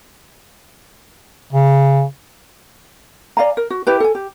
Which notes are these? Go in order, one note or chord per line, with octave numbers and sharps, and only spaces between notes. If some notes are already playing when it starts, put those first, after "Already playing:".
C#3
D5 F5 G#5 A#5
A#4
F#4
E4 G4 B4
A4 G#5
G4